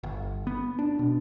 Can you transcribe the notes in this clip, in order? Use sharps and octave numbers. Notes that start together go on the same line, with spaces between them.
G1
B3
D4
B2